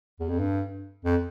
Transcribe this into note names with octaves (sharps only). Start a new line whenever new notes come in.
E2
F2
G2
F2